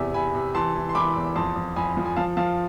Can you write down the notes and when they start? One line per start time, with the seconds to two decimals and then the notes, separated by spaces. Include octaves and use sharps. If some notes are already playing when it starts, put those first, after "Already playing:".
Already playing: E2 C3 E5 G#5
0.14 C3 G#5 B5
0.35 C3
0.55 E3 A5 C6
0.75 E3
0.89 C6
0.95 E3 B5 D6
1.16 E2
1.35 F2 A5 C6
1.56 F2
1.76 F2 G#5 B5
1.97 F3
2.06 G#5
2.16 F3 F5 A5
2.37 F3 F5 A5